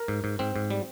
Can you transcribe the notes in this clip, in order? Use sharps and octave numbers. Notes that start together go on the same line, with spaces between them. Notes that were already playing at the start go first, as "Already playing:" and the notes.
Already playing: A#4
G#2
G#2
G#2 C4
G#2
G3